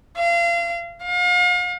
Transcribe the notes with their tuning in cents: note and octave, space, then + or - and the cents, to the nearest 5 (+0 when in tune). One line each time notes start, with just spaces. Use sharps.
F5 -30
F5 +40